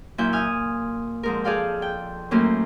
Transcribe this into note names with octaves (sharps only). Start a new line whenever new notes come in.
F#2 A#2 E4 E5 G6
G#5 D#6 F6
F2 G#2 A#4
G#4 A4 D5 F5 G5
G5
F#2 A2 A#3 C#4 C5